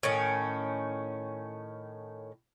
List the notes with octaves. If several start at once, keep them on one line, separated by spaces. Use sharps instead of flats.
A2 D#3 C#4